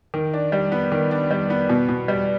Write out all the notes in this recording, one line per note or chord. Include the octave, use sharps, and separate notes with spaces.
D#3
D4
G3
B3
D#3
D4
G3
B3
B2
B2
G3